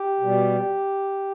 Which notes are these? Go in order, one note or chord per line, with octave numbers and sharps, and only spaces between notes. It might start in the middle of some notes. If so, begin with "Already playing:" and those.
Already playing: G4
B2 G3